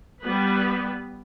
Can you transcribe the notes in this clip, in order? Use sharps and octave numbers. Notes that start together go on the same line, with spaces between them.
G3 B3 B4